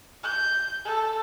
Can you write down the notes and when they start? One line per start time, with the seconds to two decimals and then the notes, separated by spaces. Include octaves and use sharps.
0.23 G6
0.85 A4